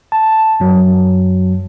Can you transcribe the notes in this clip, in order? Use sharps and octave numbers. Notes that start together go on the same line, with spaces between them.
A5
F#2 F#3